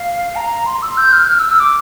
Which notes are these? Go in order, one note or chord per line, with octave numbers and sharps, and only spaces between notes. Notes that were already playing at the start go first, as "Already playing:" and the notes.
Already playing: F5
A#5
C6
E6
G6
F6
G6
F6
E6
E6
D6